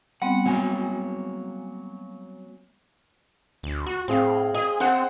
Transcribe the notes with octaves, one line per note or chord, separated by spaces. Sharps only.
G3 B3 C4 F#5
F#3 A#3 G#5
D2
F#4
A2 C4 G#4 F5
G#4 D#5
C4 C5 F#5 G#5